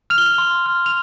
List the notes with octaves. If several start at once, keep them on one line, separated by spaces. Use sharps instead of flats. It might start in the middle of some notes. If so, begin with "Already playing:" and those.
F6 F7
G7
F7
C6
F6
F7